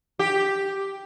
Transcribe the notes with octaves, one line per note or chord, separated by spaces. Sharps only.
G4